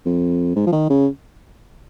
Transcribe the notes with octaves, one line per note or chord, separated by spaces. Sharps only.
F2
G#2
F3
D#3
C#3